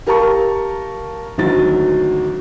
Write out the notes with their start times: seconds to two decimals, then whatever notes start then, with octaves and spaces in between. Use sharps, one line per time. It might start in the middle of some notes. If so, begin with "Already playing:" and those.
0.06 G4 A#4 F5 A5 A#5 C#6
1.38 G#1 D2 F#3 A6